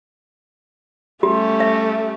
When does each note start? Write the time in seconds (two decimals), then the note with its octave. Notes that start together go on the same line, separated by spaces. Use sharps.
1.23 G3 A3 C#4 G4
1.60 E5